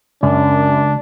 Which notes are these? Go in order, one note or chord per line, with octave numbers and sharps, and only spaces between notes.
C#2 F#2 D4